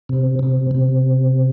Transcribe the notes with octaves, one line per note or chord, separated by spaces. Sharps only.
C3
C3
C3